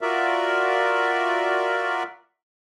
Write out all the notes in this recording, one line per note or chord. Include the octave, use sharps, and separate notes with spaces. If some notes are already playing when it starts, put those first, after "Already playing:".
F4 F#4 A#4 D5 E5